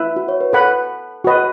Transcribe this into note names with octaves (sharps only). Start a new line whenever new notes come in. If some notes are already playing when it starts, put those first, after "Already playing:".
Already playing: E4 B4 E5
F#4
C#5
B4
A4 B4 F#5 B5
F#4 B4 D#5